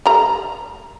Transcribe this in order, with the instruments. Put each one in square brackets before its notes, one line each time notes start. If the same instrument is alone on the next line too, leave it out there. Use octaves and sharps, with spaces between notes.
[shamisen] G3 A3 A#5